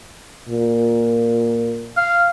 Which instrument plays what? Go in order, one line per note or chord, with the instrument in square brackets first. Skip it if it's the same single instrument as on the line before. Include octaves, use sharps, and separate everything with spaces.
[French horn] A#2
[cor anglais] F5